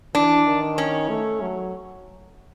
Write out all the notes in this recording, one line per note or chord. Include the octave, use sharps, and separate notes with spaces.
E3 D4
D#3
C#4
A3
F#3